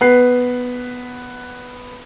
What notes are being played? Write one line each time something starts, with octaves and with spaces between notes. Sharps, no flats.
B3 B4 C7